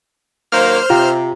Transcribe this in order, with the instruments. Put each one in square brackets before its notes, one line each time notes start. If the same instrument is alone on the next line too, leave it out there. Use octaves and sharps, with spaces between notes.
[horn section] D#3 F#3 A#3 [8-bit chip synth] C5 F6
[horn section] C3 [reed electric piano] F4 G5 A#5